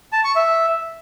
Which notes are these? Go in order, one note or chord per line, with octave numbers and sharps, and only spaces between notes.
A5
C#6
E5